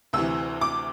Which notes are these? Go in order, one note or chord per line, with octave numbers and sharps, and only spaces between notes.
D2 C3 E3 E6
D6